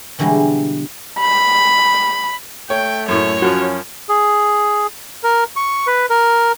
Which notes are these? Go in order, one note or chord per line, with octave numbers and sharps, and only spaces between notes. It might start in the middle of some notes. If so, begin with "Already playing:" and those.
B2 D3 E3 G3 G#3
B5
A3 C#5 G5
F#2 A2 C#5
F#2 F3 C#4 F#4
G#4
A#4
C#6
B4
A#4